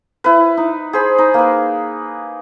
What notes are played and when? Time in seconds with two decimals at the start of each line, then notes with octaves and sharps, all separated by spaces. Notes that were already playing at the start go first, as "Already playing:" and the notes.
0.24 E4 B4
0.57 D#4
0.93 G#4 C5 B5
1.18 D#4
1.34 A#3 B4